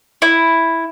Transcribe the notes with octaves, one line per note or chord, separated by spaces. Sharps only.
E4